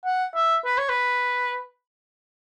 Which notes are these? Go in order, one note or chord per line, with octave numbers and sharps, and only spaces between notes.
F#5
E5
B4
C#5
B4